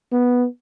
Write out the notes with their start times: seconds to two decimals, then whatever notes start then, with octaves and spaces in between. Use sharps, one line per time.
0.12 B3